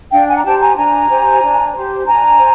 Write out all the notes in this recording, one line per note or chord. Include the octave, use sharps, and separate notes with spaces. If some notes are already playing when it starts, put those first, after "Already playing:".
D4 F5 G5
F#5 G#5
A#5
G4 C5 G5 A5
G#5 A#5
D4 G#5 A#5
G4 C5
D4
G4 C5
D4 G#5 A#5
C5